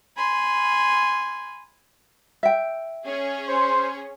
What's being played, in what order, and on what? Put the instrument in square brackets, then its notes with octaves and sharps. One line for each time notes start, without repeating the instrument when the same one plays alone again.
[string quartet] G#5 B5 C6
[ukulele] E5 G5
[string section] C#4 G#4 C#5
[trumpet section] C5 C6